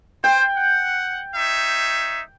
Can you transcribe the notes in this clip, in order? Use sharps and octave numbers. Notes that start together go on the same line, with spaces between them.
C5 G5
F#5
D#4 C#5 E5